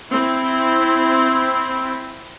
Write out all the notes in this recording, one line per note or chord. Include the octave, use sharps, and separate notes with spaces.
C4 E4